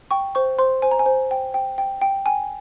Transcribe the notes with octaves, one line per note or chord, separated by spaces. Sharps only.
G5 C#6
C5 C#6
C5 C6
C5 G#5
A#5
G#5
C5
G5
G5
G5
G5
G5 G#5